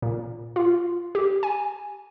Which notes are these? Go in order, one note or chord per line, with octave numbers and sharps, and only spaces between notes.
A#2
F4
G4
G#5